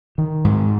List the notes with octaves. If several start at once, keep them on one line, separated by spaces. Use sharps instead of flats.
D#3
G#2